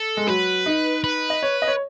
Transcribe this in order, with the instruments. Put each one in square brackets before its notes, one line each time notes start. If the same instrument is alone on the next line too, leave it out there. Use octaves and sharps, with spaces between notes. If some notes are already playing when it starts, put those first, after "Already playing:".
Already playing: [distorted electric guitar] A4
[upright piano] G#3
[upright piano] F#3 [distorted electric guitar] B4
[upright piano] D#4
[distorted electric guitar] B4
[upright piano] D#5
C#5
D#5
C#5